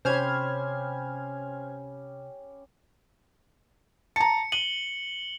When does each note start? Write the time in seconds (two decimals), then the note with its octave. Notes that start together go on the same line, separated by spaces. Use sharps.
0.05 C3 C#4 G4 C5 B5 F6 G#6
4.16 A5 A#5 C#7
4.52 D#7 F#7 G7